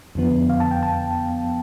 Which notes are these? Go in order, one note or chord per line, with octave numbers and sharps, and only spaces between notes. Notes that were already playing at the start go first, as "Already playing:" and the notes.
F2 D3 F3 B3
F5
A5
G5
A5